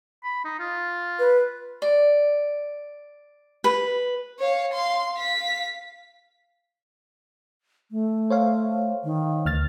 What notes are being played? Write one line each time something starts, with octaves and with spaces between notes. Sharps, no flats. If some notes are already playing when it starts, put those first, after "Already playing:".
B5
D#4
F4
B4
D5
B4
C#5 F5
F5 C6
F5 B6
A3
C5 C#5 F5
D#3
D2 F6 A6